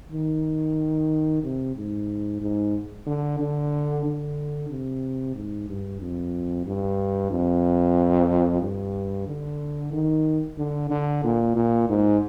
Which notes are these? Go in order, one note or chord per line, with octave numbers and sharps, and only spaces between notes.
D#3
C3
G#2
G#2
D3
D3
D3
C3
G#2
G2
F2
G2
F2
G2
D3
D#3
D3
D3
A#2
A#2
G#2